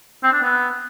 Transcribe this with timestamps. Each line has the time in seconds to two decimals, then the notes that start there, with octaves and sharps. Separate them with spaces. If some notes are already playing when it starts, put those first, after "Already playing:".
0.23 C4
0.33 D4
0.42 B3